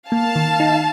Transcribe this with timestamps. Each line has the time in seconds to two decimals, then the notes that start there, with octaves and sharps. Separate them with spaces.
0.11 A#3 F5 A5
0.36 D#3
0.60 D#4